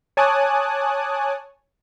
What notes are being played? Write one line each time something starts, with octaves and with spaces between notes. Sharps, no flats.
C#5 G#5 A5 D6 D#6 F#6